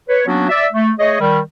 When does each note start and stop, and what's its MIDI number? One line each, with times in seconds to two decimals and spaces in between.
0.09 0.23 71
0.09 0.23 73
0.26 0.49 54
0.26 0.49 58
0.26 0.49 59
0.26 0.49 61
0.26 0.49 62
0.26 0.49 66
0.49 0.65 74
0.49 0.65 76
0.73 0.90 57
0.99 1.15 57
0.99 1.15 68
0.99 1.15 73
0.99 1.15 75
1.19 1.39 51
1.19 1.39 55